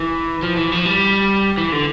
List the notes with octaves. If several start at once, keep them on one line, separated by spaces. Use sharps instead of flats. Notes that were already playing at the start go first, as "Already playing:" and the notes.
Already playing: E3
F3
E3
F3
G3
E3
D3